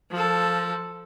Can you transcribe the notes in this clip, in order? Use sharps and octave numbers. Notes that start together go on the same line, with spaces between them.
F3 A4